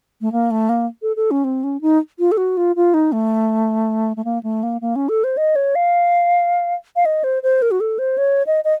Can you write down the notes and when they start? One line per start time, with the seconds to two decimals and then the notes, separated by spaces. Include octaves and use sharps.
0.21 A3
0.32 A#3
0.51 A3
0.69 A#3
1.02 A4
1.16 A4
1.31 C#4
1.44 C4
1.64 C#4
1.81 D#4
2.19 F4
2.32 A4
2.37 F#4
2.57 F4
2.76 F4
2.94 D#4
3.12 A3
4.17 A3
4.25 A#3
4.43 A3
4.63 A#3
4.81 A#3
4.96 C#4
5.09 A4
5.24 C5
5.37 D#5
5.56 C#5
5.75 F5
6.96 F5
7.05 D#5
7.24 C5
7.43 C5
7.62 A#4
7.71 F#4
7.80 A4
7.99 C5
8.18 C#5
8.47 D#5
8.65 D#5